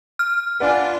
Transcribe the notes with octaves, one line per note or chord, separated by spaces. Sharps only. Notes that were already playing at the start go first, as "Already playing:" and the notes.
F6
D4 F4 B4 D5 F#5 G#5